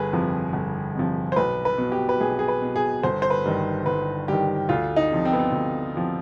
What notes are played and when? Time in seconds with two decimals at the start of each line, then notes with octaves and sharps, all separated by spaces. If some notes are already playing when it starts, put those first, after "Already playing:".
Already playing: G1 G#4 B4
0.12 F2 C3 F3
0.53 G1
0.95 F2 C3 F3
1.32 C5
1.36 B1 B4
1.65 B4
1.78 B2
1.92 G4
2.09 B4
2.20 B1 G#4
2.39 G#4
2.48 B4
2.62 B2
2.76 G#4
3.03 G1 C5
3.22 C5
3.30 B4
3.45 G2 D#3
3.86 G1 B4
4.28 G2 D#3 G4
4.69 D2 F4
4.96 D#4
5.11 C3 F3
5.25 C4
5.33 B3
5.39 C4
5.52 D2
5.95 C3 F3